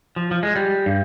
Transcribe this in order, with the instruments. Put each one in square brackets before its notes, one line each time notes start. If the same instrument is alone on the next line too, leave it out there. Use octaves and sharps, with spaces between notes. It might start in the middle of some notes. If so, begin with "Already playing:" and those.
[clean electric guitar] F3
F3
G#3
G3
G2